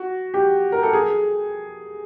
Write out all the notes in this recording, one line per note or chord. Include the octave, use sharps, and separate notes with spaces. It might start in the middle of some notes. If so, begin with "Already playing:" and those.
Already playing: F#4
G4
A#4
A4
G#4